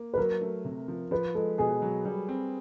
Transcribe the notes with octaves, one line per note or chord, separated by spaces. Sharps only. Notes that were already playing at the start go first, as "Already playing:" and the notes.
Already playing: A#3
B4
F#3 A#4
A3
C3
F3
F3 B4
G#3 A4
B2 G#4
F#3
G3
C4